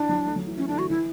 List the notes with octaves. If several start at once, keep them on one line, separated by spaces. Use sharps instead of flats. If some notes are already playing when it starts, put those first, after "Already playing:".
Already playing: E3 D4
F#3
A3
F#3
E3
E3 C#4
D3 D4
E3 F#4
E3 E4